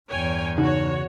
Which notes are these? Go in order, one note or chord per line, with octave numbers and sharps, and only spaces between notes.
E2 G2 C#5 G5 G#5
C#3 D#4 F#4 C#5